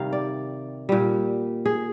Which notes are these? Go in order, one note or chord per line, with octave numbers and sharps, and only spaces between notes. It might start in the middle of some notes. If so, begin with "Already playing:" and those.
Already playing: C3 D#3 G3 F5
D5
A#2 G3
G#4